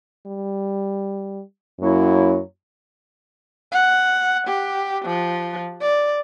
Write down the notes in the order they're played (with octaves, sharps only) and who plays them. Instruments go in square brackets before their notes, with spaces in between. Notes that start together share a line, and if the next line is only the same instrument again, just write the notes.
[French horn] G3
[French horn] F#2 [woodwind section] F#3 A#3 E4
[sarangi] F#5
G4
F3
D5